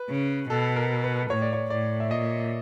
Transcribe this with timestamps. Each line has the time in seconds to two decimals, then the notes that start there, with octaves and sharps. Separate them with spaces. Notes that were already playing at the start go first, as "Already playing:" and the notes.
Already playing: B4
0.10 C#3
0.50 B2 A4
0.76 A#4
1.04 B4
1.30 A2 C#5
1.42 D5
1.53 C#5
1.70 A2 D5
2.00 E5
2.10 A#2 D#5